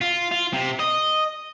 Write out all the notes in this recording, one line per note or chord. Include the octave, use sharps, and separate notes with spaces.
F4
F4
C3
D#5